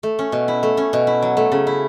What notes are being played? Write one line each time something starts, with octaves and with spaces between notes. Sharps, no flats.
A3
C#4
B2
E4
A3
C#4
B2
E4
F#3
A3
C#3
E4